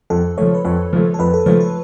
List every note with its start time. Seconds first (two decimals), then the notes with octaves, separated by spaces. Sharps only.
0.10 F2 A4
0.38 F3 A3 C#5
0.55 B4
0.65 F2 C#5
0.93 F3 A3
1.14 A4
1.19 F2 B4
1.34 A4
1.46 F3 A3 C#5
1.60 A4